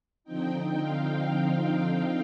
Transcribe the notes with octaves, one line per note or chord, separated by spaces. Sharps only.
D3 F3 C4 D#4 G5
F5
F5
F5